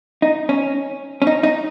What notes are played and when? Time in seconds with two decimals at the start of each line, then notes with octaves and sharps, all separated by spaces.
0.22 D#4
0.49 C#4
1.22 C#4
1.27 D#4
1.43 D#4